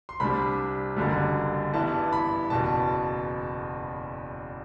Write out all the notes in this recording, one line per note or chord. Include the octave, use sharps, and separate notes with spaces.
C6
C2 C3 G3 D4 B5
F#1 F#2 D3 G3
G2 E3 G3 B3 E4 A5
B5
F#1 E2 B2 A5